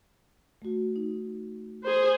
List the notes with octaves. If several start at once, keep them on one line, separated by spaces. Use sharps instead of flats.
A3 F#4
D#4
G#4 C5